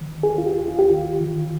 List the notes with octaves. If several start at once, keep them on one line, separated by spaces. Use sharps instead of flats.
D#3
G#4
D#2
F4
G4
D#2
F4
G4
D#3 F4
D#3